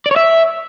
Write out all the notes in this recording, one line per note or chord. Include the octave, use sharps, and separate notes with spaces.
D5
C#5
E5